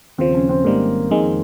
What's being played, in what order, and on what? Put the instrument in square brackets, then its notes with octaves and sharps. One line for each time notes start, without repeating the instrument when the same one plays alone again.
[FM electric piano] D#2 C#3 F3 [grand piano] C4
[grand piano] C#4
C4
[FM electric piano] G#1 G#2 D#3 G3 [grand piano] A#3
[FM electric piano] F2 D#3 G#3